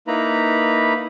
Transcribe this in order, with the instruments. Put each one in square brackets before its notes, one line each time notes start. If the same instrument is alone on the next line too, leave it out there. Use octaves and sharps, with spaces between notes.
[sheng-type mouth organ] A#3 D#4 E4 B4 A#5 B5